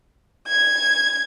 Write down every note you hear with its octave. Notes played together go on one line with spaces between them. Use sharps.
G#6